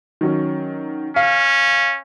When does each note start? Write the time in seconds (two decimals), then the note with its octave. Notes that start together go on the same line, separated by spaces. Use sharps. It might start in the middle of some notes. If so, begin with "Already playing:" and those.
0.21 D#3 F#3 C#4
1.16 C#4 F5